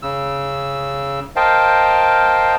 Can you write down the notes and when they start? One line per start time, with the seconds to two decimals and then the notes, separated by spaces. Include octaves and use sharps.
0.03 C#3 E6
1.36 A#4 C5 D#5 F5 G5 A5